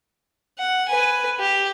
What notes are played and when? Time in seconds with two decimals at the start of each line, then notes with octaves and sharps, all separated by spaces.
0.58 F#5
0.88 B4 G#5
1.40 G4